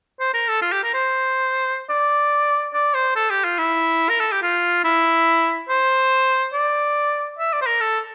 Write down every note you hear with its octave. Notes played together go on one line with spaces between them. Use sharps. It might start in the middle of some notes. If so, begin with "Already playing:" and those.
C5
A#4
A4
F4
G4
A#4
C5
D5
D5
C5
A4
G4
F4
E4
A#4
A4
G4
F4
E4
C5
D5
E5
D5
C5
A#4
A4